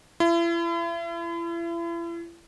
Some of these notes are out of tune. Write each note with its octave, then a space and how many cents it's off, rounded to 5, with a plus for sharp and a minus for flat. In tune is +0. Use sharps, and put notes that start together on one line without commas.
E4 +40